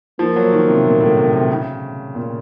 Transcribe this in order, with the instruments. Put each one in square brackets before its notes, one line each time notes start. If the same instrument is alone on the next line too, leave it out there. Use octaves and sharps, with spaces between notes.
[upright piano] F3 [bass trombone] A#3
[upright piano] F#3
D#3
C3
A#2
A2
C3
C3
C#3
A#2